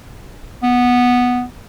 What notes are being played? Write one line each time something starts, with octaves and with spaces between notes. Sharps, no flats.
B3